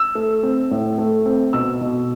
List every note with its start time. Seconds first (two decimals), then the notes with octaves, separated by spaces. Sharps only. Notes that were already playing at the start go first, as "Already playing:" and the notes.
Already playing: E6
0.15 A3
0.43 C4
0.71 A2
0.98 A3
1.26 C4
1.53 B2 E6
1.81 B2